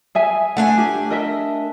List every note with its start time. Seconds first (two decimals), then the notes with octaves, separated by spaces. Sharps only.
0.15 G#4 E5 G#5
0.57 A3 D4 F#5 G#5
0.78 G4
1.10 A#4 D#5 E5